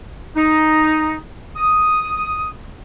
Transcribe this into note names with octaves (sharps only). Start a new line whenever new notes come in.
D#4
D#6